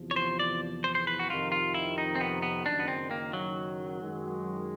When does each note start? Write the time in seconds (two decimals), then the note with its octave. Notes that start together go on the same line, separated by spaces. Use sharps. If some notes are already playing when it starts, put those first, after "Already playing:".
Already playing: E2 C3 F3
0.11 C#5
0.16 C5
0.39 D5
0.84 C5
0.95 C5
1.07 B4
1.19 F#4
1.30 F2 C3 D#3 F4
1.52 F4
1.74 E4
1.98 D#4
2.15 C4
2.21 B3
2.42 B3
2.66 F#1 F#2 D#3 D4
2.80 B3
2.88 C4
3.11 A#3
3.33 F#3
4.01 F#2 D#3 G#3